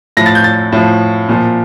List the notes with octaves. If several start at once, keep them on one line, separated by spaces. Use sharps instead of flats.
A2 F3 A#6
A6
G6
A6
A2 F3
A#2 F3